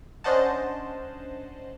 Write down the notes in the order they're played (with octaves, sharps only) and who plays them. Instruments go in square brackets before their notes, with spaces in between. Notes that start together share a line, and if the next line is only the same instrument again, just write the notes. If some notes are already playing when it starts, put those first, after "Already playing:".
[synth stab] C#4 D4 C5 D#5 F#5 A5